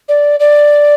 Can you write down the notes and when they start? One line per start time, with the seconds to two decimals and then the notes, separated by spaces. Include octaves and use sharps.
0.09 D5
0.40 D5